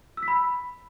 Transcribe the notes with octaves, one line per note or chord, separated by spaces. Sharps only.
E6
B6
B5